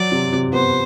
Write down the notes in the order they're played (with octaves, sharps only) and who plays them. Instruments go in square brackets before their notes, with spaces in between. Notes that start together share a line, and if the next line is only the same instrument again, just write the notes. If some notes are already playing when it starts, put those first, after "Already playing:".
Already playing: [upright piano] F#3 [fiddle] D5
[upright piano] C3
C3
[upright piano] B3 [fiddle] C5